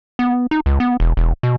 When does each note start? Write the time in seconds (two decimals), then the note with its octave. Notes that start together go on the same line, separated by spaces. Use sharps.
0.19 B3
0.51 D#4
0.66 C#2
0.80 B3
1.00 E1
1.17 E1
1.43 B2